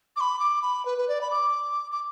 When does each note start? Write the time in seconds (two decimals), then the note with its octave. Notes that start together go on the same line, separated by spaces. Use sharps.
0.16 D6
0.21 B5
0.39 D6
0.62 B5
0.86 B4
0.98 B4
1.08 D5
1.21 B5
1.31 D6
1.92 D6